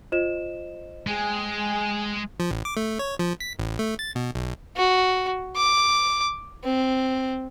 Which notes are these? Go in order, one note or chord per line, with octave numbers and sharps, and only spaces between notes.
F4 C5 D#5 E7
G#3 G#4 G5 G#5
F3
A1
D6
A3
C#5
F3
B6
A1
A3
A6
B2
B1
F#4
D6
C4